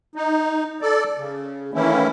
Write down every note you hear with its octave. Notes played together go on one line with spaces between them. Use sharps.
D#4
A4 D5
C#3
D#3 E3 A3 A#3 C#4 E4